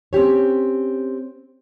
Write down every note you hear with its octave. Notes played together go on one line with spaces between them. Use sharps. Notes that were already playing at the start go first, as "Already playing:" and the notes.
C4 C#4 G4 C#5